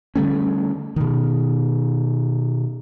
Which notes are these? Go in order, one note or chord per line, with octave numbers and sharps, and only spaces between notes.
D3 G3 A3 C#4
B2 D#3